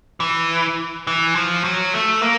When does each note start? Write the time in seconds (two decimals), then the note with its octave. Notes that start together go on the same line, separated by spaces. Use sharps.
0.20 E3
1.07 E3
1.35 F3
1.64 F#3
1.94 A3
2.22 A#3